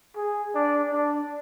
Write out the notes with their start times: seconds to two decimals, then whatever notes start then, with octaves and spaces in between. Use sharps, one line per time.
0.16 G#4
0.55 D4
0.92 D4